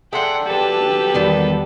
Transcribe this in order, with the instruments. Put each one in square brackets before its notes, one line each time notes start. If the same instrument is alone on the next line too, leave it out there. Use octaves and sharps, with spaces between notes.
[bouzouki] D4 E5 [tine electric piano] G#4 A4 C6 [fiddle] F#5 G5
[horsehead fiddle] F#3 G4 [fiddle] A4 B4 [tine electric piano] G5 A5
[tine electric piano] E2 D#3 G3 [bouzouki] D3 B3